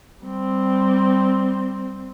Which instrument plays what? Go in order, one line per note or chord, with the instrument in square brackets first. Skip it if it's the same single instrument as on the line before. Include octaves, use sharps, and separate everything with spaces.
[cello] G3 C4